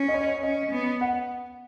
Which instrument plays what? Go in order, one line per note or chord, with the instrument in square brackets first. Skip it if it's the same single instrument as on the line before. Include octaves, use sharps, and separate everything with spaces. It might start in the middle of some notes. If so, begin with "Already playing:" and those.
Already playing: [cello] C#4
[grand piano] D#5
C#5
C#5
[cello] C#4 [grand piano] D#5
[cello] B3
[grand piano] F#5